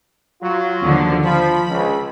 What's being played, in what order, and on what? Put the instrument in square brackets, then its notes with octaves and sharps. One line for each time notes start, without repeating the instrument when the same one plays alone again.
[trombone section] F#3 F4
[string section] D#2 D3 F3
[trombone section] F3 [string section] B5
[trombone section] C#2